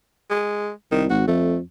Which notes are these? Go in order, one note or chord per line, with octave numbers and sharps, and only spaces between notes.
G#3
C2 D#3
G#1 F#4
F2 A3